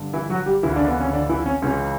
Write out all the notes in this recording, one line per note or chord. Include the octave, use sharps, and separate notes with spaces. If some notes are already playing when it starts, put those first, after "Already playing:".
Already playing: G2 D3
E3 E4
F#3 F#4
G3 G4
D2 C#3 E3 E4
D3 D4
B3
C#4
D3 D4
E3 E4
C#4
C#2 C#3 E3 C#4